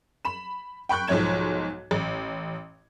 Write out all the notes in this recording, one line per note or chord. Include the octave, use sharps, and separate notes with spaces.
B5 E7
G5 B5 C#6 F#6 G6
B1 G#2 F3 C#5 G#6 E7
A1